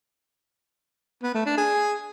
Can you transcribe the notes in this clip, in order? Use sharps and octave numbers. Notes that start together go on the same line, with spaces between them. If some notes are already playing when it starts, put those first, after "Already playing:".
B3
A3
D4
G#4